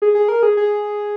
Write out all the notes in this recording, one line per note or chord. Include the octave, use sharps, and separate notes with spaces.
G#4
G#4
A#4
G#4
G#4